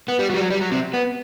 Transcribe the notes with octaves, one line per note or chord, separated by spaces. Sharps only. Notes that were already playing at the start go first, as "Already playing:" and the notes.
B3
G3
F#3
G3
F#3
G3
F#3
C3
B3